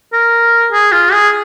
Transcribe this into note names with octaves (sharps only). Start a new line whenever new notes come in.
A#4
G#4
F4
G#4